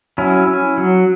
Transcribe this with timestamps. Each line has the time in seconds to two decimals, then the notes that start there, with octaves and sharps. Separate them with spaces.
0.18 F#3 C#4 E4
0.47 C#4
0.77 F#3